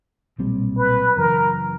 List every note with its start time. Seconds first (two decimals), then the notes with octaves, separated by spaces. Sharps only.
0.38 B1 A#2 G3 C4
0.77 B4
1.16 F#2 C#3 E3 A#4